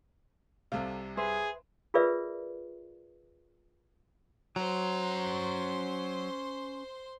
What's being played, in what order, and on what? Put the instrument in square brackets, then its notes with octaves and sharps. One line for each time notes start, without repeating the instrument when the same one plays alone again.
[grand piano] C2 C3 [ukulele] A4 F5
[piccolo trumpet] G#4 [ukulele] B4 C5 E5
[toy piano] F4 G#4 A#4 B4 D5 E5
[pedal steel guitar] F#3 [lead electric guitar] C#4 A#5 [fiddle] C5 C6